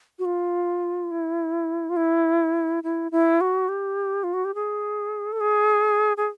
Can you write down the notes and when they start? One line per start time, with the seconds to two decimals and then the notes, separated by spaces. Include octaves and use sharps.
0.19 F#4
0.25 F4
1.11 E4
1.89 F4
1.96 E4
2.83 E4
3.12 E4
3.41 F#4
3.69 G4
4.24 F4
4.34 F#4
4.45 G4
4.55 G#4
5.33 A4
5.41 G#4
6.17 G#4